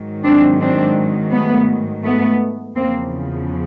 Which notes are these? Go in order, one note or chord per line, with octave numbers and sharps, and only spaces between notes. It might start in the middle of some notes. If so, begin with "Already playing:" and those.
Already playing: G#2 D#3 F#3
C4 D4
C4 D4
A3 B3
A3 B3
E2 C#3 F3 A#3 C4